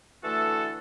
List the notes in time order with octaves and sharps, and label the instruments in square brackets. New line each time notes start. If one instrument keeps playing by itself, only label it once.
[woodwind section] D3 E3 A3 F#4 A4